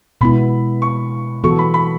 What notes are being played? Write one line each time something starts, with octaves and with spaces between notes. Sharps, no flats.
B2 G#3 B3 E4 B5
C#6
E3 B3 F#4 A4 C#6
B5
B5